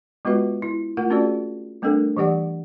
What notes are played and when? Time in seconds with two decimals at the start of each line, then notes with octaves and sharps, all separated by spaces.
0.25 G#3 B3 F4 F#4 B4 E5
0.62 E4
0.97 A3 F4 A#4 F#5
1.10 C4 C#4 F4 F#4 G#4 D5
1.82 G3 A3 C4 D4 A4 A#4
2.17 E3 G3 G4 D5 F#5